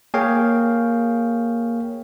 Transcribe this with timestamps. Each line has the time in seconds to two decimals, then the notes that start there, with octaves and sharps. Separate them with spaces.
0.14 A#3 G#4 C#5 F5 G5